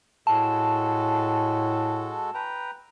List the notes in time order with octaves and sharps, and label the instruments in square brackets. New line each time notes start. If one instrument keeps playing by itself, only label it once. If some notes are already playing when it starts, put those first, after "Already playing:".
[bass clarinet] A2 [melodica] G#3 F#4 A4 [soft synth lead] A5
[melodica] B4 G5 A#5